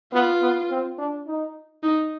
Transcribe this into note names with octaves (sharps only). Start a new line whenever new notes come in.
B3 F4
B3
C4
D4
D#4
D#4